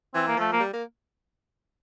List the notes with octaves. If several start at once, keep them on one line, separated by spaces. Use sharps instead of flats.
E3 C4
A#3
F3 A3
A#3
G3
A#3